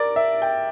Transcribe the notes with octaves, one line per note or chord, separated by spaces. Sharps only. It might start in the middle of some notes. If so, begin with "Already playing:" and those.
Already playing: A#4 D5
E5
G5